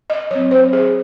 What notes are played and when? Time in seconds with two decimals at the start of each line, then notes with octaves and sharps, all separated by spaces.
0.10 D#5
0.31 F#3 C4 C#5
0.51 C5
0.73 G#4